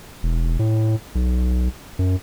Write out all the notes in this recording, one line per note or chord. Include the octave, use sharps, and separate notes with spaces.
E1
A2
B1
F#2